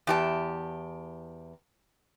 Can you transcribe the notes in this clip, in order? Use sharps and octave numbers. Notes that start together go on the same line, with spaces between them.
E2 G4 A5